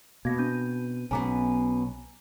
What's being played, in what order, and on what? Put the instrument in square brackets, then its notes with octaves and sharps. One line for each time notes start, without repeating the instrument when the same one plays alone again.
[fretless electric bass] B2 [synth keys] A#3 F5 D6 [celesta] G#6 A#6
[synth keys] C4 D#7 [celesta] D4 G6
[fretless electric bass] B1 [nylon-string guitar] B2 B3 C#4 [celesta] G#5 A#5 D6